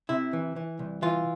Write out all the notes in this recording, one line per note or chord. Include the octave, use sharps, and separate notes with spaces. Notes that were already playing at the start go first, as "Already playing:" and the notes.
C3 E4
E3
E3
C2
E3 F4